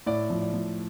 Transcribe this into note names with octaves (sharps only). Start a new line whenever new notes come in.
A2 D5
F3
D5
F3